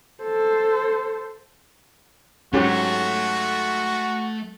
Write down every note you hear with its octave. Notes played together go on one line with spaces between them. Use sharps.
A4 C5
G#2 F#3 A3 C#4 F#4 G4